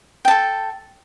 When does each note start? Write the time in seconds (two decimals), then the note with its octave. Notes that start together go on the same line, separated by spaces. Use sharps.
0.25 G5
0.28 A5
0.31 A4